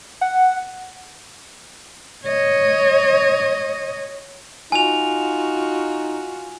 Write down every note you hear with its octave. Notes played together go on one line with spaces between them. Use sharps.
F#5
C#5 D#5
D#4 F4 F#4 G#5 F7